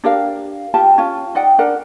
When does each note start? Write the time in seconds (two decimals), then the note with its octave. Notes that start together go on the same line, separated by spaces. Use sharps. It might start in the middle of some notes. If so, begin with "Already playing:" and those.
0.04 D4 G4 A#4 F5
0.74 F4 G4 A5
0.98 C#4 F4
1.35 D#4 D5 F#5 G5
1.59 D4 A#4 F#5